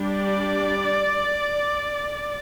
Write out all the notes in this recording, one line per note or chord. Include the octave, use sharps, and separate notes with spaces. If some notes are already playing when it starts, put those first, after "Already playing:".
Already playing: G3 D4
D5